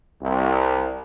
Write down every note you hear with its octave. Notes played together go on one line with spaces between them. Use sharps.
C2